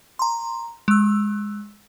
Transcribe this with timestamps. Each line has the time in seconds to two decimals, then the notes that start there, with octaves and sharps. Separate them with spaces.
0.19 A#5 C6
0.88 G#3 E6